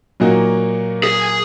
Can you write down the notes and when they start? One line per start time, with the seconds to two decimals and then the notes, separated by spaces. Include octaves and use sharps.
0.20 A#2 F#3 A#3 D#4 F#4
1.04 G#4